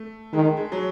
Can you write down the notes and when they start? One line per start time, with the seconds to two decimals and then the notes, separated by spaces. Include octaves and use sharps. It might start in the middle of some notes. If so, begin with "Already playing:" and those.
Already playing: A3
0.33 D#3 G#3
0.57 G#3
0.72 F#3